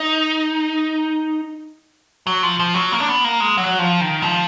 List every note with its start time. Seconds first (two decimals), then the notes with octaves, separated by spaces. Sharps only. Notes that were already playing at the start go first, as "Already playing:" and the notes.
Already playing: D#4
2.27 F#3
2.43 F3
2.59 F3
2.75 F#3
2.92 A#3
3.00 D4
3.08 B3
3.24 A#3
3.40 G#3
3.57 F#3
3.79 F3
4.01 D#3
4.22 F3